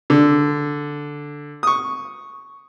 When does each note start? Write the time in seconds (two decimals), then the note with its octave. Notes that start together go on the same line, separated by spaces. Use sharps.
0.10 D3
1.63 C#6 D#6